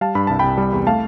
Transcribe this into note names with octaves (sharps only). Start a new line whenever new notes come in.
G3 F5 A5
G2 B5
C2 A5
C2 G5 B5
G3
E2
A3 F5 A5